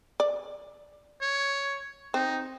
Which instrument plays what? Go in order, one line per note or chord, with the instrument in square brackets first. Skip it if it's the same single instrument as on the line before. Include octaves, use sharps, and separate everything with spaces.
[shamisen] D5
[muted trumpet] C#5
[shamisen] C4 [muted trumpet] D#4